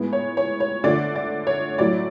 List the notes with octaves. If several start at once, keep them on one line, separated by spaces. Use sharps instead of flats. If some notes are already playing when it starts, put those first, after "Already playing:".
Already playing: A2 G#3 B3
C#5
C#5
C#5
D3 F3 A3 D5
D5
C#5
A2 F#3 A3 D5